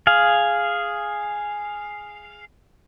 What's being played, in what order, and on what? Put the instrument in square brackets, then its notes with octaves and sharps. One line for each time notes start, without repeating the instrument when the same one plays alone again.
[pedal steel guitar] G#4 F5